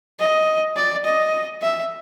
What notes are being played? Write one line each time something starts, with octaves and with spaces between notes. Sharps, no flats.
D#5
D5
D#5
E5